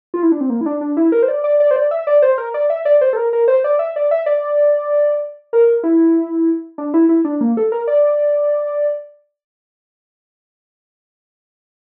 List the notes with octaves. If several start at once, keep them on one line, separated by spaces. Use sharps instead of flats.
F4
E4
D4
C4
A#3
E4
D4
D4
E4
A#4
C5
D5
D5
D5
C5
D5
E5
D5
C5
A#4
D5
E5
D5
C5
A4
A#4
A#4
C5
D5
E5
D5
E5
D5
A#4
E4
D4
E4
E4
D4
A#3
A4
A#4
D5